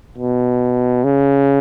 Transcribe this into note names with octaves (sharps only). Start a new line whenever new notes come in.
B2
C#3